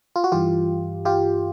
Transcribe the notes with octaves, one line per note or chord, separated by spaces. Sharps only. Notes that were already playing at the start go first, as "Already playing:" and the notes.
F4
F#4
G2 E3 F4 G4
F4 G4